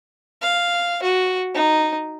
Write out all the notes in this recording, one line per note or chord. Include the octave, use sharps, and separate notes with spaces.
F5
F#4
D#4